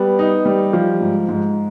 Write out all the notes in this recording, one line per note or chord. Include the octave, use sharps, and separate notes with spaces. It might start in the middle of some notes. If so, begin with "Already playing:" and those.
Already playing: G3 B3
D#4
G3
F3
G#2
G#2